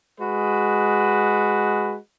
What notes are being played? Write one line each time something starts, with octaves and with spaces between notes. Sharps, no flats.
G#3 F#4 B4